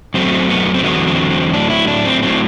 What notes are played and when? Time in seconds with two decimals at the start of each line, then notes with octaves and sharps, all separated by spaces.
0.14 F#2 F#3 A3 C4
0.49 B3
0.74 C4
0.83 E2 D3 F#3 A3 B3
1.07 C4
1.30 C4
1.53 A2 F#3 A3 D4
1.70 E4
1.87 D4
2.05 C4
2.22 A2 F#3 A3 C4